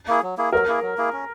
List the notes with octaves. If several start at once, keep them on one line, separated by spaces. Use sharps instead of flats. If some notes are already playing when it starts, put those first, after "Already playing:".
A#3 E4 G#4
F#3
A#3 E4 G#4
F#3 A#4
A#3 E4 G#4
F#3
A#3 E4 G#4
C#4